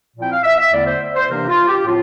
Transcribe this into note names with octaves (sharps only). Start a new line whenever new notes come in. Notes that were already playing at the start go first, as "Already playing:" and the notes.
A#2 F3 C4 E4 G5
F5
E5
E5
E2 D3 A3 E4 D5
C5
C5
C3 E3 A#3 D4 A#4
F4
G4
A2 F3 C4 F4